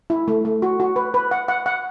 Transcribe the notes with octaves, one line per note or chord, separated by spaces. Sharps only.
E4
A3
A3
F#4
F#4
B4
B4
F#5
F#5
F#5